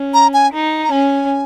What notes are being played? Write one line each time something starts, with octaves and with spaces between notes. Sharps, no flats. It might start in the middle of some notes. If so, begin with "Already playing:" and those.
Already playing: C#4
A#5
G#5
D#4
A#5
C#4 G#5